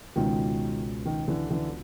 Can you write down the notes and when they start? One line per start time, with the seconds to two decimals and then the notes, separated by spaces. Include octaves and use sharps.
0.16 C#2 B2 D#3 G#3 C#4 F4
1.05 D#3
1.28 D3 E3
1.50 D3 E3